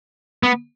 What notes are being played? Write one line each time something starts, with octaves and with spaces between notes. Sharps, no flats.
B3